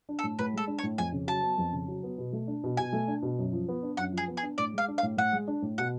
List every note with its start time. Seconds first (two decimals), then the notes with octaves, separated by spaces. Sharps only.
0.09 D4
0.19 A4
0.23 A2
0.39 A2 B4
0.53 G#3 A4
0.67 D4
0.79 C#5
0.83 A2
0.98 F2 G#5
1.12 C#3
1.27 F#3 A5
1.42 B3
1.58 F2
1.72 C#3
1.88 F#3
2.03 B3
2.18 B2
2.33 A3
2.48 D4
2.64 B2
2.77 B2 G#5
2.93 A3
3.08 D4
3.22 B2
3.38 F#2
3.53 F3
3.69 B3
3.83 D4
3.97 F#2 F#5
4.12 F3
4.17 G#4
4.28 B3
4.37 G#4
4.43 D4
4.58 A2 D5
4.73 G#3 F5
4.88 D4
4.98 F5
5.03 A2
5.17 A2 F#5
5.33 G#3
5.48 D4
5.62 A2
5.78 B2 F#5